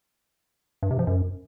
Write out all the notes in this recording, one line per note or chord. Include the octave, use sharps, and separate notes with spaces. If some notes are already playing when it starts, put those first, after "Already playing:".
G2
C3
F3
F#2